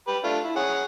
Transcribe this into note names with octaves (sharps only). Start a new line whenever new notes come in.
G4 B4
A3 D4 F4
E4
C#4 G#4 F#5